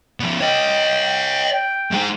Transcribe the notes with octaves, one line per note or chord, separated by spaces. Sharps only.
F3 B3
C#5 D#5 G5
G5
G#2 G#3